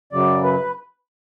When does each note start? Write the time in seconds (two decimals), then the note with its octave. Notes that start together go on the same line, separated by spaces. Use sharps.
0.12 F#2 C#3 F#3 D5
0.43 B4